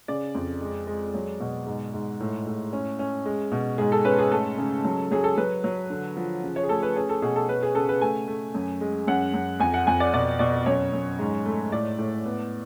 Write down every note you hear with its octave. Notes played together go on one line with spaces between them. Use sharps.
C#3 D5
F2
G#3
G#3
F#3
B2
G#2
G#2
A2
A2
C#4
C#4
G#3
B2
G#2 G#4
A4
C#4 B4
G#4
A3 A4
C#3
F#3
F#3 G#4
A4
F#3 B4
F#3
D3
F3
C#3
C#5
G#4
A3 A4
B4
C#4 G#4
A4
B2 G#4
A4
C#4 B4
G#4
C#3 A4
B4
A3 G#5
A3
F#2
G#3
F#2 F#5
F#2
F2 G#5
F#5
F2 G#5
D5
B2 D5
B2 D5
F#2 C#5
F#2
G#2
A3
A2 D5
A2
B3